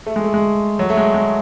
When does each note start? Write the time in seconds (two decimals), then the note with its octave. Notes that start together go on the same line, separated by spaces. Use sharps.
0.07 A3
0.16 G#3
0.24 A3
0.34 G#3
0.79 F#3
0.90 A3
0.97 G#3
1.14 G#3